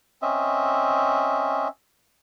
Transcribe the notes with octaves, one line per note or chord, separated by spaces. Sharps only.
C4 C#4 D#5 E5